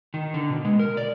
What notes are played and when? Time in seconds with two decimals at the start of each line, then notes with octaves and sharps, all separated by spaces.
0.14 D#3
0.34 D3
0.50 B2
0.65 G#3
0.79 A#4
0.97 D5